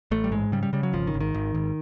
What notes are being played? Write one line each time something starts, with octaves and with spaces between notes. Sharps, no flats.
A1 A3
G3
G#2 G#3
C#3 G3
G3
C#3 G3
F#3
G#1 F3
D#3
G#1
D#3
G#1
G#1